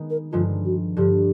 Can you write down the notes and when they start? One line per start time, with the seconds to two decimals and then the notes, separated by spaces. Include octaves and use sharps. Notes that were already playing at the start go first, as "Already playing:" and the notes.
Already playing: D#3 G#3 B3 D#4
0.10 A#4
0.32 G2 D3 F3 G#3 F4
0.65 F#4
0.97 G2 D3 F3 G4